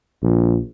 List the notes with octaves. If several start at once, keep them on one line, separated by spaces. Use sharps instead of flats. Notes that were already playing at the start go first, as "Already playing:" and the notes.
A#1